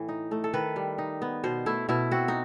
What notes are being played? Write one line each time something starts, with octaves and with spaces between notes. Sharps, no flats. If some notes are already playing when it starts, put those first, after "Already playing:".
Already playing: A2 E3
D#4
A3
A4
D#3 B4
G3
D#4
B3
B2 C5
A3 E4
B2 E4
C4 F#4
D#4